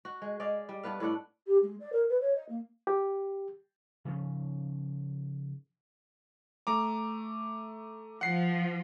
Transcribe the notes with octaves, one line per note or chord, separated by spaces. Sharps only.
F#4
G#3
G#3 D5 D#5 F5
G3
G2 B3 B4 F5
A2 B3 D4 F#5
G4
G#3
D5
A#4
B4
C#5
D#5
A#3
G4
C#3 F3 C#4
A3 A#5 D6
F3 F#5 C7